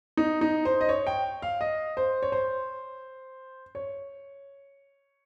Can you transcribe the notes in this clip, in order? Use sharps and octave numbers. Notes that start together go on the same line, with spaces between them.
D#4
D#4
C5
D#5
C#5
G5
F5
D#5
C5
C#5
C5
C#5